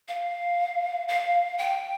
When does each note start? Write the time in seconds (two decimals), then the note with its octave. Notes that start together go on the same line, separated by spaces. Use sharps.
0.08 F5
1.08 F5
1.58 G5